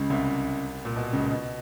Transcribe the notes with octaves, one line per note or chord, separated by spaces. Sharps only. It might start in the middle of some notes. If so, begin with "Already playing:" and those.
Already playing: C#2 C#3
C2 C3
A#2
B2
C#2 C#3
B2